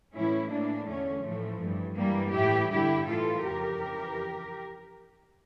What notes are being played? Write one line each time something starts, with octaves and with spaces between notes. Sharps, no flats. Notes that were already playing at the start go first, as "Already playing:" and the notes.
A2 E3 C#4 E4
A2 E3 A#3 D4
E2 D3 A3 C#4
A2 E3 F3 A3
G2 E3
G2 E3 G3 A#3
A2 E3 E4 G4
G2 D3 E4 G4
A2 E3 F4 A4
F2 C#3 E3 G4 A#4
F2 C#3 E3